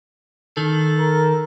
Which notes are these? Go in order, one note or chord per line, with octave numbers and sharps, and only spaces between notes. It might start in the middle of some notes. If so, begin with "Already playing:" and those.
D#3 A4
A#4